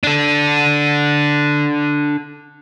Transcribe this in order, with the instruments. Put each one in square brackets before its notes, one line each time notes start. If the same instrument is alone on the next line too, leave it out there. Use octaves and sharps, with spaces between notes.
[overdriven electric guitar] D4 A4